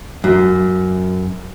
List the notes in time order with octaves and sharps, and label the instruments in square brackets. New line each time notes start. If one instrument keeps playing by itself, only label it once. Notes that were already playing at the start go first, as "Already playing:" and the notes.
[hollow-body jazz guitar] F#2